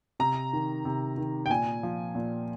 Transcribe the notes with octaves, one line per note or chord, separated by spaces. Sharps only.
C3 A#5
D#3
C3
D#3
G5
A#2 G#5
F3
A#2